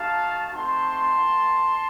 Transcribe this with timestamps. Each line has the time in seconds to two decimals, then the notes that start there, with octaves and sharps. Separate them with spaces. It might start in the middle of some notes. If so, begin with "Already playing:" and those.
Already playing: A3 D#4 F#4 F5 A5
0.54 A3 C4 D#4 F#4 A5 C6
1.14 A#3 D#4 F#4